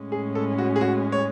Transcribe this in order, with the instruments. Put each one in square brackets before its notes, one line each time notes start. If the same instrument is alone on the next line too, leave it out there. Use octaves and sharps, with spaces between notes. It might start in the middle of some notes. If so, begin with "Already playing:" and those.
Already playing: [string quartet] A2 G#3 C#4
[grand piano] G#4
A4
F#4
G#4
F#4
C#5